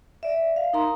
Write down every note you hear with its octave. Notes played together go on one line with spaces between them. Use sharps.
D5 E5
F5
D#4 A#4 A#5 C6